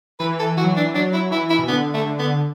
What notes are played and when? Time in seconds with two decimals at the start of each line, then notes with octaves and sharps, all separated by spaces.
0.20 E3 B4
0.39 A4
0.57 E3 F#4
0.64 F#3
0.72 E3 D4
0.94 F#3 D4
1.13 E4
1.31 E3 E4
1.50 E4
1.59 B2
1.68 D3 B3
1.94 A3
2.06 D3
2.19 B3